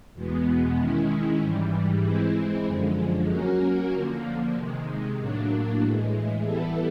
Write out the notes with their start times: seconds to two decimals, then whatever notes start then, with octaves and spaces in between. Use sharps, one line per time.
0.14 E2 B2 G#3 B3
0.77 D#3 G#3 C#4 E4
1.40 G#2 E3 G3
2.03 E3 G#3 C4 E4
2.66 F#2 D3 F3 G#3
3.29 F#3 A#3 C#4 F#4 A#4
3.91 D3 F3 A#3
4.54 C3 D#3 G#3
5.18 A2 F#3 A#3 D4
5.81 A2 E3 G#3
6.44 E3 G3 B3 E4 A4